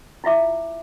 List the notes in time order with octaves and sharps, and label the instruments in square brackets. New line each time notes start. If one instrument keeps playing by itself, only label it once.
[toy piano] E4 F4 E5 D6